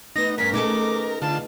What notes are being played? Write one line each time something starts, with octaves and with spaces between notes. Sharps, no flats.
A3 B3 D#4 B4 A#6
E2 G2 C#4 A#4 B6
A3 C#4 D#4 G#4 A4 D6
D3 F4 A5